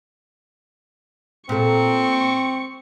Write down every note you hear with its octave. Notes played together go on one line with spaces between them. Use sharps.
A#2 C4 A4 C#6